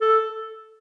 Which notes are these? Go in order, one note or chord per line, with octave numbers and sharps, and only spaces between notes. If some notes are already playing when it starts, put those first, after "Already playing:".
A4